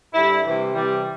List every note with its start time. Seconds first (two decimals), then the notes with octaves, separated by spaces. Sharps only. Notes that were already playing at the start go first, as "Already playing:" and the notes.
0.14 G2 D3 G3 E4
0.43 C3 E3 G3
0.73 C3 E3 G3